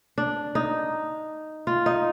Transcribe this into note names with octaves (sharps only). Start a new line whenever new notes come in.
D4
D#4
F4
D#4